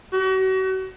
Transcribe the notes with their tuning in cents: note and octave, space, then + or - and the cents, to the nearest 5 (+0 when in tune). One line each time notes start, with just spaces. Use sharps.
F#4 +35